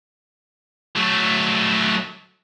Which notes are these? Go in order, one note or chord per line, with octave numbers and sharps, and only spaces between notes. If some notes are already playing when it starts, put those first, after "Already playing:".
F#3 A3